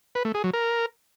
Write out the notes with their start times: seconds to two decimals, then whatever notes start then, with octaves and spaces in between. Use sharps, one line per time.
0.15 B4
0.25 A3
0.34 G#4
0.44 F#3
0.53 A#4